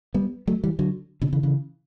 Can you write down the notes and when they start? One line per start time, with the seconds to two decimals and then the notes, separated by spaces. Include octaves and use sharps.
0.14 G3 B3
0.47 F#3 A3
0.64 E3 G3
0.79 D3 F#3
1.22 B2 D3
1.33 C#3 E3
1.43 C#3 E3